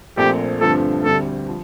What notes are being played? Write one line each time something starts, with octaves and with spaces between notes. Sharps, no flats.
A#1 A#2 A3 C4 G4
G2 D3 F3 A3 C4 A4
D2 D3 G3 C4 A4
F3